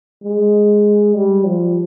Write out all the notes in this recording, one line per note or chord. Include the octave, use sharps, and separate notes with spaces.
G#3
G3
F3